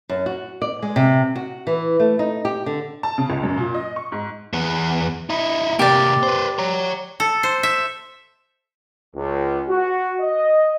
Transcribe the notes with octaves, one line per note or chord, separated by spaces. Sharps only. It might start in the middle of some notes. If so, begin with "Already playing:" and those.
F#2
F#4
D5
G#3
C3
F#4
E3
A3
D#4
G4
D3
A5
C#3
C#2
F#2
A#2
D#5
C#6
G#2
E2 B3
D#4 E4
C3 A#3 G4 D5
B4 C5
C#5 A#5
A4
C5
E5
C#2
F#4
D#5